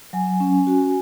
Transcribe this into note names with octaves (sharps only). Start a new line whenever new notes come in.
F#3 G#5
C#4
F#4